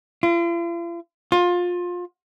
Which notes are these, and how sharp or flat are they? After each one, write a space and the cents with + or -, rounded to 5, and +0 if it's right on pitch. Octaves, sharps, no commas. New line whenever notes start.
F4 -45
F4 +20